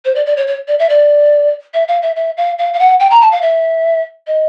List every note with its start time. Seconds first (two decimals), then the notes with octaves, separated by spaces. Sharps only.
0.05 C5
0.15 D5
0.26 D5
0.37 C#5
0.47 C#5
0.68 D5
0.79 E5
0.89 D5
1.74 E5
1.88 F5
2.02 E5
2.16 E5
2.37 F5
2.58 F5
2.73 F5
2.79 F#5
3.00 G5
3.10 A#5
3.21 A5
3.32 F5
3.42 E5
4.27 D#5